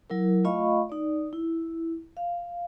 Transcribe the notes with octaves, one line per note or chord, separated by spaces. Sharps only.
F#3 E4 A#4
A3 F4 D#5 F5 B5 C#6
D#4 D5
E4
F5